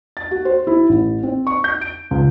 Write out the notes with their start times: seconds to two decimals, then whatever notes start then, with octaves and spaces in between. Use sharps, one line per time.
0.17 A6
0.31 F#4
0.45 C5
0.67 E4
0.89 A1
1.23 C4
1.47 C#6
1.64 G6
1.81 D7
2.11 C#2